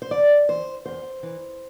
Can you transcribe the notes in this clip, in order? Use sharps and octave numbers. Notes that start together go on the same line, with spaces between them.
C5
E2 D5
E3 C5
E2 C5
E3